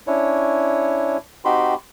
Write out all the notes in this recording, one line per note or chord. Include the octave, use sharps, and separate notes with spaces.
C#4 D4 E4 C#5
C4 D#4 F#4 G4 B5 C6